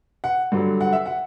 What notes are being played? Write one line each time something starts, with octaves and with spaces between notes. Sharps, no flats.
F#5
G2 D3 F#3
F#5
E5
F#5